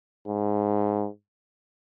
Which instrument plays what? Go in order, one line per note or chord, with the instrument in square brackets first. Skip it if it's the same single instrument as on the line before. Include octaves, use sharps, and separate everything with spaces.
[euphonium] G#2